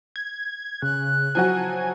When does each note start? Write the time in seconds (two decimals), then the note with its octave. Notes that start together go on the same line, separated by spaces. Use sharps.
0.16 G#6
0.82 C#3 F#6
1.35 F3 F#3 F#4 G#5